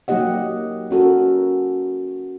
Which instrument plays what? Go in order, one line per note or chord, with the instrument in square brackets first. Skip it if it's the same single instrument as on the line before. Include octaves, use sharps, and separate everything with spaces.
[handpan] F#3 A#3 D#4 G4 D#5 F#5
C#4 F#4 A4 A#4